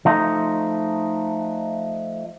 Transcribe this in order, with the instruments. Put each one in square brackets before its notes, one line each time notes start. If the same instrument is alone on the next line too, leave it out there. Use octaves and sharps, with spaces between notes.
[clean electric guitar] F3 A3 D#4